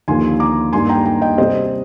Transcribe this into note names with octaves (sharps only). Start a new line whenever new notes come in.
D#2 D3 F3 A#3 G#5 C6
A#5 D6
G2 D#3 A#3 G#5 C6
G5 A#5
G5 A#5
D#5 G5
C3 G3 C4 C5 D#5